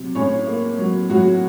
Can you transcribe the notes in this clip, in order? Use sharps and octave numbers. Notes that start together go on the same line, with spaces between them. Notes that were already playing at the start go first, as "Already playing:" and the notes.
Already playing: C3 F#3
A2 C#4 C#5
A#3
F#3
A2 F#3 F#4